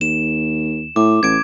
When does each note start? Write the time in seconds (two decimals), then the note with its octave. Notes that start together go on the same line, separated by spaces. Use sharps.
0.01 D#2 E7
0.96 A2 D6
1.23 A1 G#6 D7